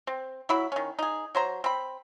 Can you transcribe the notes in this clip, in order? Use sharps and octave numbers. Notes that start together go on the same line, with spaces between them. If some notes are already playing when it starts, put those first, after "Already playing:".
C4
F#3 E4 B5
D#3 C#4
D#4 G#4
F#3 C5 A#5
C4 B5